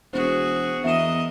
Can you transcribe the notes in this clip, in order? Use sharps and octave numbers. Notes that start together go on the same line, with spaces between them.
E1 F#4 G#4 C5
E2 A#4 D#5 E5 E7